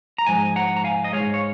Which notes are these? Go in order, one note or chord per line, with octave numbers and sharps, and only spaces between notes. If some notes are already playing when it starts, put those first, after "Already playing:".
A#5
G#2 F3 G#3 G#5
F#5 A#5
A#5
F5 G#5
D#5
G#2 F3 G#3 C#5 F5
C#5